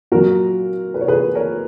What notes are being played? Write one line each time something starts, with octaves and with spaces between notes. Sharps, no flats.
A#2 F#3 F#4 A#4
B4
C#5
G#4 B4
A#4 C#5